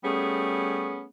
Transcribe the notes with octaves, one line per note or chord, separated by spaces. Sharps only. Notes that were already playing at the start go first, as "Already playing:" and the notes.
G3 A3 B3 C#4 G#4